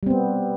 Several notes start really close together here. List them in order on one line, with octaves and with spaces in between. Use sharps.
G3 C4 B3